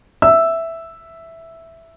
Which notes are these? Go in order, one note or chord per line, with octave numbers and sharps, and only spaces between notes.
E5 E6